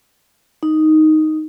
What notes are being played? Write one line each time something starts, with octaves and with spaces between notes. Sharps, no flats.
D#4